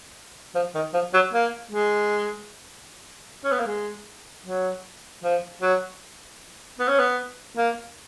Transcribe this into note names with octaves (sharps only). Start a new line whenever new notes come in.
F3
D#3
F3
F#3
A#3
G#3
C#4
B3
A#3
G#3
F#3
F3
F#3
B3
C#4
B3
A#3